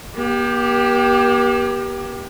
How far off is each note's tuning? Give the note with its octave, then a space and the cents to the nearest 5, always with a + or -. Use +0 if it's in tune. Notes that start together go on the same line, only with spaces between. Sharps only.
A#3 +45 G4 +0